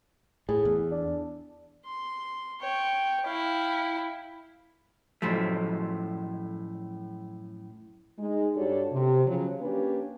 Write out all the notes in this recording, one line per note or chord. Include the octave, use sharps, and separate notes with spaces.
A2 G#4
E2
D4
C6
C#5 G5
E4 F5 G5
F#2 A2 F3 F#3 A3
G#3 D#4
G2 D4 F#4 G4 A4 C#5
C3
C#3 F3 F#3
A#3 C#4 D4 G4 B4